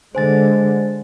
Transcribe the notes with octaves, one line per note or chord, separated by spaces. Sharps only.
D3 G#3 C5 G#5 A6